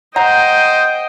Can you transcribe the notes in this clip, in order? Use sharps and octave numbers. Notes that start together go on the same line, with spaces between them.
C5 D#5 F#5 G5 A#5